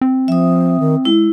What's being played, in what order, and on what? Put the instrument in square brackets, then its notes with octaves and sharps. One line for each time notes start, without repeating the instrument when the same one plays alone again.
[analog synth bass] C4
[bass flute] F3 [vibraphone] E5 D#6
[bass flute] D#3
[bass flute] G#3 [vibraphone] E4